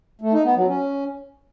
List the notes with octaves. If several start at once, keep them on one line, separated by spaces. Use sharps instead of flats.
A3
D#4
B3
F#3
C#4